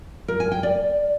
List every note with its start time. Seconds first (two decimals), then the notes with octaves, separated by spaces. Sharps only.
0.28 A#4
0.40 G#5
0.52 G5
0.63 D5